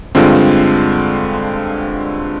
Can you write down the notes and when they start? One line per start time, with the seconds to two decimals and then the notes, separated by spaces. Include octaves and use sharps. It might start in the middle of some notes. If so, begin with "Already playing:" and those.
0.15 G2 D3 G#3 C4 F4